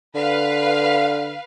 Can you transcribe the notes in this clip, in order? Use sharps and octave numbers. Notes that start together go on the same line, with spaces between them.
D3 B4 F5